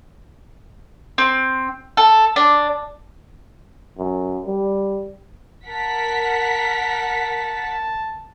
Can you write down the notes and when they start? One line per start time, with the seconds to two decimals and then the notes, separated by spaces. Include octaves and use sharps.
1.18 C4
1.97 A4
2.36 D4
3.98 F#2
4.45 G3
5.67 A#4 F#5 A5 B6